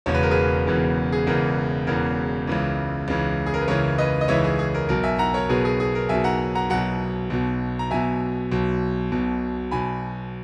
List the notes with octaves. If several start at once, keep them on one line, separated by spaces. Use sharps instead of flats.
E1 E2 C#3 E3 C#5
B4
A#4
G#4 B4
E1 E2 C#3 E3
G#4
E1 E2 C#3 E3 A#4
E1 E2 C#3 E3 A#4
C#2 C#3 E3
C#2 C#3 E3
G#4
A#4
B4
C#2 C#3 E3 A#4 C#5
B4 D#5
D#5
C#2 C#3 E3 C#5 E5
G#4
G#4
A#4
B1 B2 A#4
E5 G#5
F#5 A#5
A#4 C#5
B1 B2 G#4 B4
G#4
G#4
A#4
B1 B2 E5 G#5
F#5 A#5
F#5 A#5
B1 B2 F#5 A#5
B1 B2
A#5
B1 B2 E5 G#5
B1 B2
B1 B2
B1 B2 G#5 B5